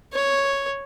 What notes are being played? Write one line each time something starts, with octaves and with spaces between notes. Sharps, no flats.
C#5